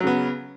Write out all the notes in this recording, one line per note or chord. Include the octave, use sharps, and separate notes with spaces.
C#3 F#3 B3